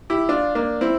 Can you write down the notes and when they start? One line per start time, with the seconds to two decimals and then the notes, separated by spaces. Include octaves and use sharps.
0.10 E4 G4
0.29 D4 F4
0.55 A#3 D4
0.81 C4 E4